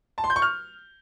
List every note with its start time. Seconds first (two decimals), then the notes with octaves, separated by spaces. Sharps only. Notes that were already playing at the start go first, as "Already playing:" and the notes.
0.18 A5
0.24 C6
0.30 G6
0.36 C#6
0.42 F6